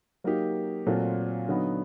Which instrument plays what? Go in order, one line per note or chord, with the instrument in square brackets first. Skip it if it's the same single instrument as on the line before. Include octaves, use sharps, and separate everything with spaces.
[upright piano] F#3 A#3 D#4 G4
A#2 F#3 A3 C4 F4
D3 F#3 B3 D#4